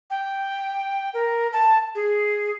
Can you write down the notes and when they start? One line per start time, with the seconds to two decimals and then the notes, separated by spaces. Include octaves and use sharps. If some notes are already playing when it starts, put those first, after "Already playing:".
0.10 G5
1.14 A#4
1.53 A5
1.95 G#4